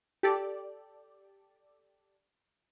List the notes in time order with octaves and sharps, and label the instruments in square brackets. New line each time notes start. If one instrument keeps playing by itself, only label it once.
[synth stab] G4 A4 D5